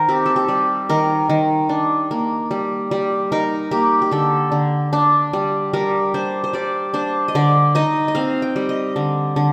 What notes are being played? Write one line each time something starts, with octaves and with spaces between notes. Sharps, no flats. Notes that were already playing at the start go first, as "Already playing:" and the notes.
Already playing: D#3 A#4 C5
C4 G4
A4
G4
G3
D#3 A#4
D#3
D4
A#3
G3
G3
D#4 A#4
A#3 G4
G4
D3 A4
D3
D4
G3
G3 A#4
D4 C5
C5
G3 D5
D4 C5
D#5
D3 D5
D#4 D#5
D#5
C4 F5
G5
G3
D#5
D3
D3